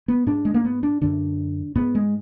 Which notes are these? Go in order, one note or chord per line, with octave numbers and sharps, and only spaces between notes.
B3
G#2 D4
G#3
A#3
B3
D4
F#2 D3 D4
G#2 B3
G#3